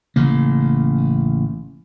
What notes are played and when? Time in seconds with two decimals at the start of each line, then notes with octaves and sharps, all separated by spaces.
0.16 A1 C#3 A#3